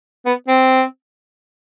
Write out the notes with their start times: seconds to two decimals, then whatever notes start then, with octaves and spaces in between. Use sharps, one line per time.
0.26 B3
0.48 C4